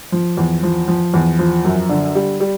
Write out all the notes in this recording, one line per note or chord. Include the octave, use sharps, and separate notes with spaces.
F3
E2
F3
F3
E2
F3
F#2
D3
G3
G3